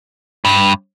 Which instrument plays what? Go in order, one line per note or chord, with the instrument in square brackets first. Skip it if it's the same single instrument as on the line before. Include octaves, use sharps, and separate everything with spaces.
[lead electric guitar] G2